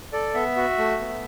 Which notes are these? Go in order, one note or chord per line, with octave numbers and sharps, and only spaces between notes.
A4 D5
B3 E5
F#4
A3
B3